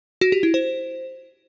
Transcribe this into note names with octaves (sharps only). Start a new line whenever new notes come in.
F#4
G4
E4
C5